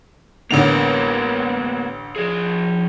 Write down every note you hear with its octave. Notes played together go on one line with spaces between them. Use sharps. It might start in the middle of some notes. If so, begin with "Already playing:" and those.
A1 D3 A#3 B3 A#4 F7
F3 G#4